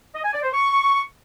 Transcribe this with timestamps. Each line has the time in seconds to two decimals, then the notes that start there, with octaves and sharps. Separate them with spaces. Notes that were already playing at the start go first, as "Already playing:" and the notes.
0.14 D#5
0.24 G#5
0.34 D5
0.43 C5
0.53 C#6